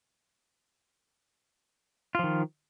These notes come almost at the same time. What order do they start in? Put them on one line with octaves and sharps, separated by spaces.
F4 F3 D#3